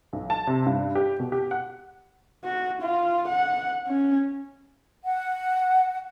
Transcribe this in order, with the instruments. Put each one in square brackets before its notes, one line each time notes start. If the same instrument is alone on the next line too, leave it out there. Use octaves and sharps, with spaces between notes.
[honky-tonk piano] B1
A5
C3
G2
G4
B2
G4
F#5
[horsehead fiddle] F#4
F4
F#5
C#4
[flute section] F#5